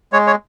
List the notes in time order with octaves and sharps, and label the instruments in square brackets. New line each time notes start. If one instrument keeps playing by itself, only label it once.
[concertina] G#3 C#5
C#5